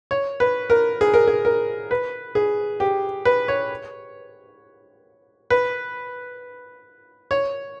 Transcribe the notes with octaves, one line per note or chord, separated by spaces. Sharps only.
C#5
B4
A#4
G#4
A#4
G#4
A#4
B4
G#4
G4
B4
C#5
B4
C#5